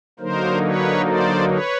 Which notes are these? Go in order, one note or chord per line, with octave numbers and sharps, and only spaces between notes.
D3 F#3 A#3 D#4 A#4 C5
B4 C#5
C5 D5
B4 C#5